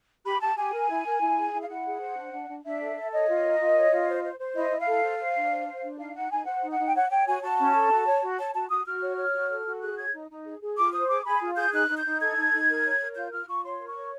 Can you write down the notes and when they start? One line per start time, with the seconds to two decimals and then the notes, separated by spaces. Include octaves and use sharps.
0.25 G4 B5
0.40 G4 A5
0.56 G4 G#5
0.73 A#4
0.89 E4
1.05 A#4
1.21 E4
1.36 G#4
1.53 E4
1.62 F5
1.68 E4 F#5
1.85 G#4
2.00 C5
2.16 D4
2.32 D4
2.48 D4
2.64 D4 E5
2.80 A4
2.96 A4
3.11 C#5 D#5
3.28 F4
3.44 A#4
3.60 F4
3.75 C#5
3.91 F4
4.07 C5
4.24 C5
4.39 C5
4.55 E4 D#5
4.71 E4
4.79 F5
4.87 A4
5.03 C5
5.18 C5
5.35 D4
5.50 C5
5.67 C5
5.83 D4
5.98 D#4 F5
6.15 D#4 F#5
6.30 D#4 G#5
6.46 C5 F#5
6.62 D#4
6.71 F#5
6.79 D#4
6.86 G5
6.94 C#5 F#5
7.10 C#5 G5
7.26 F#4 G#5
7.42 F#4 A5
7.59 C#4
7.74 A4
7.91 F#4
8.06 C#5
8.22 F#4
8.38 C#5 A5
8.54 F#4 A5
8.69 F#4 D#6
8.86 F#4 F6
9.02 C#5
9.17 C#5
9.34 F#4
9.49 A4
9.66 F#4
9.81 G#4 F#6
9.97 C#5 G#6
10.13 D#4
10.29 D#4
10.45 G#4
10.62 G#4
10.77 F4 D6
10.92 C5 D#6
11.09 G#4 D6
11.24 G#4 B5
11.41 F4
11.56 G#4 G6
11.72 D#4 F#6
11.89 D#4
11.97 G6
12.05 D#4
12.20 A4 G#6
12.37 D#4
12.53 D#4
12.68 A#4
12.85 C#5
13.00 A#4
13.16 F4 G6
13.32 F4 F6
13.47 F4 C#6
13.64 C#5 C6
13.80 A#4
13.88 C#6
13.95 C#5